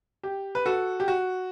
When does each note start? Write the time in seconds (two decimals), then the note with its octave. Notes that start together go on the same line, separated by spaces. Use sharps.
0.23 G4
0.55 B4
0.66 F#4 A4
1.00 G4
1.08 F#4